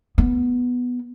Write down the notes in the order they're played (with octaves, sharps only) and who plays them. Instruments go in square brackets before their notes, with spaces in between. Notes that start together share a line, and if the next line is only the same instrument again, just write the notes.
[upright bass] B3